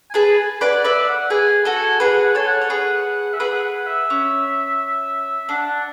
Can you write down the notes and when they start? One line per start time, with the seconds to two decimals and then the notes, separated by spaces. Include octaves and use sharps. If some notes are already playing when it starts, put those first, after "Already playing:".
0.10 G#5
0.14 G#4 B4 A5
0.37 G#5
0.61 B4 D5 F#5
0.84 B4 D5 E5
1.08 F#5
1.30 G#4 B4 G#5
1.65 F#4 A4
1.77 G#5
2.00 G#4 B4 F#5
2.24 F#5
2.35 A4 C#5 G#5
2.46 F#5
2.61 C#5
2.70 G#4 B4
3.33 E5
3.39 G#4 B4 F#5
3.63 F#5
3.86 E5
4.10 C#4
5.49 D4 F#5
5.66 F#5